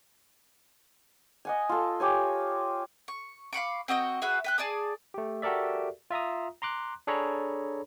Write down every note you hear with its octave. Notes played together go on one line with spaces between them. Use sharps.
D#5 F#5 G#5
F4 A4
G4 C#5 G#5
C#6
F5 B5 C#6 D6
C4 F#4 D#5 G5
F#4 G#4 B4 E5
B4 G5 F#6
G#4 D5 A5 D#6
A3 G4
F#4 G4 A4 A#4 D5 E5
F4 E5 A#5 D#6
A#5 C6 D6 F#6
D4 G#4 A4 C#5 A#5 B5